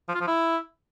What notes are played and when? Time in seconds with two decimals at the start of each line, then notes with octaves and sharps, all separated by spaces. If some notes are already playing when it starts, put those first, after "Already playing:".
0.08 F3
0.15 F4
0.21 F3
0.27 E4